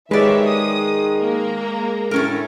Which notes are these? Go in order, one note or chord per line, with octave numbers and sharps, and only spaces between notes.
D#3 G#3 G4 B4 C#5 D5 E5
D#6
A#3 A#5
A2 A3 C#4 A#4